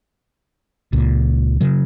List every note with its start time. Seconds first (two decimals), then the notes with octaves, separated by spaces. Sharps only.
0.93 C#2 A#2
1.61 C#3 F#3